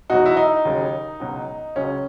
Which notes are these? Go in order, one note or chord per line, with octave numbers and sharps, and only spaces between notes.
E2 B2 F#3 D#4 F#4
E4
D#4
D#2 C#3 F#3
C#2 B2 F#3
C#2 C#3 F#3 C#4